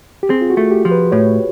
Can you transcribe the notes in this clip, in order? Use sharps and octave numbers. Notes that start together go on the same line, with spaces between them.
G4
C4 G#4
F4
F#4
A3
G4
F3
B4
A2 C#5